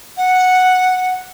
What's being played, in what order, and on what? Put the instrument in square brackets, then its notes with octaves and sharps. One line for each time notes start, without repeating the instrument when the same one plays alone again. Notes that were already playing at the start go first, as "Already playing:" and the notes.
[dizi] F#5